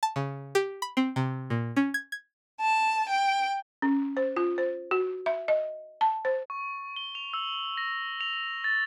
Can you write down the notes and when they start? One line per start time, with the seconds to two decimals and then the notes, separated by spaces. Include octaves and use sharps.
0.03 A5
0.16 C#3
0.55 G4
0.82 B5
0.97 C4
1.16 C3
1.50 A#2
1.76 C#4
1.94 G#6
2.12 G#6
2.60 A5
3.10 G5
3.82 C#4
4.17 C5
4.36 F4
4.58 C5
4.91 F#4
5.26 E5
5.48 D#5
6.01 A5
6.25 C5
6.50 C#6
6.96 G7
7.15 F7
7.33 E6
7.77 A#6
8.21 F7
8.64 A6